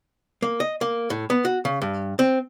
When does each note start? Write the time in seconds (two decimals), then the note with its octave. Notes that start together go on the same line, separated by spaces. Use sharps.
0.42 A#3
0.60 D#5
0.81 A#3
1.10 A2
1.30 B3
1.45 F#4
1.65 C#3
1.82 G2
2.19 C4